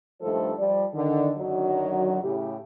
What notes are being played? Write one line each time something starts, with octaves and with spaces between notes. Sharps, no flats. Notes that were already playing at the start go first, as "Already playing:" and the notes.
G2 D#3 F3 A3 A4 C5
F3 G3 D5
D3 D#3
F#2 D3 D#3 F#3
A2 C#3 G4